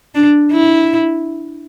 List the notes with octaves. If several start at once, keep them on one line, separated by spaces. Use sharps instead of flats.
D4
E4